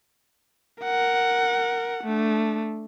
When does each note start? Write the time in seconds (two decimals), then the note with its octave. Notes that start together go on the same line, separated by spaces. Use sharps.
0.83 A#4 F#5
2.04 A3 D4